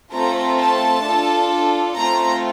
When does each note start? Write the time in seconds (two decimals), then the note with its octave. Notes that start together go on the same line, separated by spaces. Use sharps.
0.13 A3 C4 F4 A4 A#5
0.59 A5
1.05 D4 F4 A4
1.97 A3 C4 F4 A#5